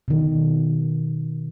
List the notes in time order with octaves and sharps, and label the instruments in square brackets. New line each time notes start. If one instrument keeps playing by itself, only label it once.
[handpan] B2 D#3